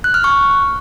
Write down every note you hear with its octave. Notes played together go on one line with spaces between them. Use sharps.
F#6
F6
C#6